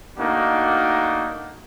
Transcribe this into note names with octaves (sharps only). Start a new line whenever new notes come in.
A3 A#3 D4 D#4 F#4